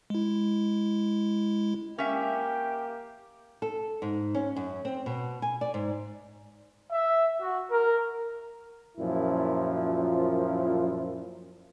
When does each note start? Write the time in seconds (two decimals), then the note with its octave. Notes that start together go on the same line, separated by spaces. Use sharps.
0.10 G#3 E4
1.98 A#3 C#4 G4 E5
3.62 A4
4.02 G#2
4.35 C#4
4.56 F#2
4.85 C4
5.06 B2
5.42 G#5
5.61 D5
5.74 G#2
6.90 E5
7.39 F#4
7.69 A#4
8.98 F#2 A#2 F3 E4